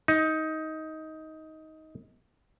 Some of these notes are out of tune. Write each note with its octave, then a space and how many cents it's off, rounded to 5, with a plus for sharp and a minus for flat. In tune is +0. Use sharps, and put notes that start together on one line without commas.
D#4 +15